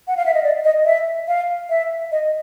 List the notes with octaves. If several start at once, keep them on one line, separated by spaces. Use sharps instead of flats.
F#5
F5
E5
D#5
D5
D#5
E5
F5
E5
D#5